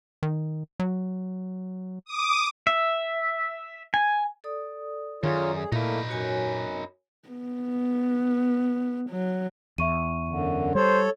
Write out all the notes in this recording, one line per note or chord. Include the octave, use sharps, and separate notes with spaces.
D#3
F#3
D6 D#6
E5
G#5
A4 D5 D#6
F#2 D#3 F4 G#4 C#5
G#4
A#2 A3 A#3 D#4 E4 B4
F#2 F#4 C#5 G#5
B3
F#3
E2 E5 C#6 D#7
F#2 D3
G3 A4 C5 C#5